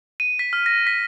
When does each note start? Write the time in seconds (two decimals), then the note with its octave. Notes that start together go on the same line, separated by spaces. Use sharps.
0.20 D#7
0.39 B6
0.53 F6
0.66 A#6
0.87 B6